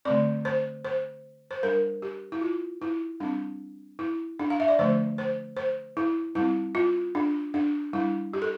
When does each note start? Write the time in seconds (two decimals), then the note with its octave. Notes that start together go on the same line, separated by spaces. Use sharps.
0.05 D3 A3 C4 D5
0.45 C5
0.85 C5
1.51 C5
1.63 G3 D4 A#4
2.02 G4
2.32 E4
2.41 F4
2.82 E4
3.20 G3 C4 D4
3.99 E4
4.39 D4
4.50 F5
4.60 E5
4.68 D5
4.79 D3 F3 A3 C5
5.18 C5
5.57 C5
5.97 E4
6.35 G3 C4 E4
6.75 F4
7.15 D4
7.54 D4
7.93 G3 D4 E4
8.33 G4
8.42 A4